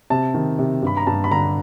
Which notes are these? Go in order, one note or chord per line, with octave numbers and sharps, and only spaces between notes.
C3 A5
D#3
C3
G2 B5
A#5
G2 A5
B5
D3 A#5